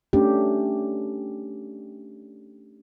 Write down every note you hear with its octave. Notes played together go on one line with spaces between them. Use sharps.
A3 C#4 D4 G4